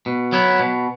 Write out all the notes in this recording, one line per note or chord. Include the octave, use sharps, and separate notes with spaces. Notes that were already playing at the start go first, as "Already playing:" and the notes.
B2
F#3 B3 E4
B2